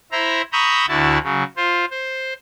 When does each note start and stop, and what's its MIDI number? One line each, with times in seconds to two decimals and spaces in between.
0.12 0.42 64
0.12 0.42 72
0.12 0.42 76
0.12 0.42 82
0.52 0.86 82
0.52 0.86 83
0.52 0.86 85
0.52 0.86 87
0.52 0.86 88
0.52 0.86 91
0.88 1.18 38
0.88 1.18 50
0.88 1.18 64
0.88 1.18 66
0.88 1.18 81
1.24 1.44 49
1.24 1.44 54
1.57 1.85 65
1.57 1.85 72
1.91 2.34 72